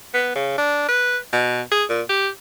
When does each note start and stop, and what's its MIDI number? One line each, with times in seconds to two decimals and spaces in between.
0.14 0.33 59
0.35 0.54 49
0.58 0.88 62
0.89 1.18 71
1.33 1.61 47
1.72 1.84 68
1.89 2.02 46
2.09 2.29 67